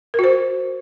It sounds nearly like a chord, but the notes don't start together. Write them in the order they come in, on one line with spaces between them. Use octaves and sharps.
A#4 F#4 C5